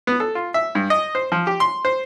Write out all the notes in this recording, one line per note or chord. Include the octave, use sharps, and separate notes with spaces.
B3
A4
F4
E5
G2
D#5
C5
F3
G4
C6
C5